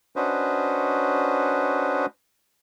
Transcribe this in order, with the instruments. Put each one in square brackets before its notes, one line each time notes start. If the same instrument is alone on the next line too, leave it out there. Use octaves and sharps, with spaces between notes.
[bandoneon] C#4 D4 F#4 B4 C5 D#5